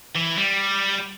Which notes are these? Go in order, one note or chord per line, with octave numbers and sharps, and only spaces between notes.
E3
G3